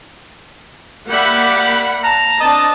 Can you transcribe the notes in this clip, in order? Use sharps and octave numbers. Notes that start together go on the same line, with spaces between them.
A#3 G4 D5 E5 F#5 B5
A5 A#5
C4 D4 D#5 A5